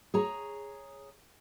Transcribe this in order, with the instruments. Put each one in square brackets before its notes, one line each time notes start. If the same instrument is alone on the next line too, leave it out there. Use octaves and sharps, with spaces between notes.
[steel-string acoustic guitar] G#4 C#5 A#5